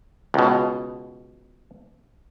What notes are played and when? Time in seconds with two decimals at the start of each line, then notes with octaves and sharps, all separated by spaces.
0.34 C#2 B2